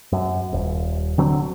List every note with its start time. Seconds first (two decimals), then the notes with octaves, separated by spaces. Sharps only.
0.12 F#2
0.53 D#1
1.18 D3 F#3 C4